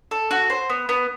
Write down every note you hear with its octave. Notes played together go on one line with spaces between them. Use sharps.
A4
F#4
C5
B3
B3